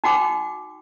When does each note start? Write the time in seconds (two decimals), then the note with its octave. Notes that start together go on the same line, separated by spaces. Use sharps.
0.04 D#4 F#4 G5 D6